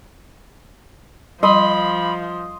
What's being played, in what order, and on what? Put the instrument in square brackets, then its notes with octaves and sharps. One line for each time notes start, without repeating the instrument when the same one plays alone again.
[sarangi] F3 [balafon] G3 [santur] D#5 C6 [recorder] B5